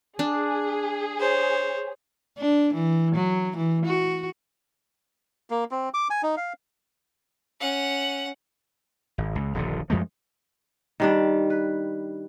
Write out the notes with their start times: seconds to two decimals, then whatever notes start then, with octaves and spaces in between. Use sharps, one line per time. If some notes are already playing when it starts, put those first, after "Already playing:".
0.19 D4 G#4
1.20 C5 C#5
2.39 D4
2.74 E3
3.16 F#3
3.57 E3
3.86 F#4
5.50 A#3
5.71 C4
5.94 D6
6.10 G#5
6.23 D#4
6.37 F5
7.60 C#4 F#5
9.18 G#1
9.35 C#2
9.55 D#1 A#1 D3
9.90 F#2 F3 G#3 A3
11.00 D#3 G3 D4
11.50 B4